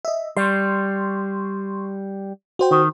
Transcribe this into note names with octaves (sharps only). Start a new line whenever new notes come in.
D#5 E5
G3 C6 C#6
F#4 C5 G5
D#3